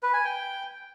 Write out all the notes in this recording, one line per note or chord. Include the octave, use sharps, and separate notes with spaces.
B4
G#5
G5